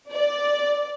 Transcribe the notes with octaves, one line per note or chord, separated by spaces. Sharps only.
D5